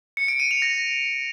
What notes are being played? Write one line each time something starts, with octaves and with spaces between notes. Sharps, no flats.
C#7
D7
D#7
F7
A#6